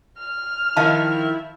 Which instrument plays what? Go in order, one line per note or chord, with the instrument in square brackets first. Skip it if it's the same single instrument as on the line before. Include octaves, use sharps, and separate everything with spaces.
[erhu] F6
[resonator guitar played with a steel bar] D#3 F3 A#4 [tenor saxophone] E4 [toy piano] F5 A5